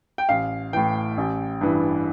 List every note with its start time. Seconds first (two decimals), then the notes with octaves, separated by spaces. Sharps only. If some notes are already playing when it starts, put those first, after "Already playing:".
0.18 G5
0.29 A1 F5
0.73 A2 E3 G5
1.17 A1
1.61 G2 E3